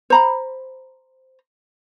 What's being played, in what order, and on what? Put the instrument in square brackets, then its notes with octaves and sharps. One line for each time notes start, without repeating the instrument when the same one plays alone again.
[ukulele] C5 A#5 B5